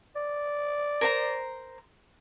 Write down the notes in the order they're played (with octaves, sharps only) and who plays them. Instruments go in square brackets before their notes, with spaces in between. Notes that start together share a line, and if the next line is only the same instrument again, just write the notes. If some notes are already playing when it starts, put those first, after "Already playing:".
[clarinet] D5
[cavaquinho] A#4 C5 A#5